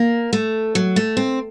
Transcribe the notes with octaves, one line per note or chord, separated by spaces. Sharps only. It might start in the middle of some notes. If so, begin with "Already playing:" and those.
Already playing: A#3
A3
F#3
A3
C4